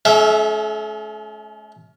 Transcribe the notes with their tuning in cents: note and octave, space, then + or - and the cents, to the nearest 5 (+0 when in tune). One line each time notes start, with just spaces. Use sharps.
A3 -45 C#4 +20 E5 +0